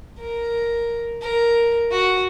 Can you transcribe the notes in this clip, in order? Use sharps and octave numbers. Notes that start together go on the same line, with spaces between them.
A#4
A#4
F#4